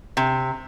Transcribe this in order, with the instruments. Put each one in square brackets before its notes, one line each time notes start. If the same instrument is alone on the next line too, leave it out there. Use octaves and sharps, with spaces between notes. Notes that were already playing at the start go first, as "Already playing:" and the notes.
[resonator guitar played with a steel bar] C3